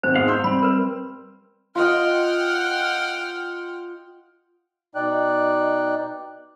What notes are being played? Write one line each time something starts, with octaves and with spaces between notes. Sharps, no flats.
G#1 C5
G#2 B3 F5
C6 E6 G6
G3 C4 B5
A#4 B4
F4 D#5 F#5 G5 F6
B2 D#4 D5 G5 F#6